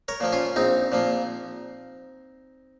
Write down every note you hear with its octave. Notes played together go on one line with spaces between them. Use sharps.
A#4 C#5
A#2 F3 A#3
C#4 F4
A#1 C4 D#4
A#2 F3 A#3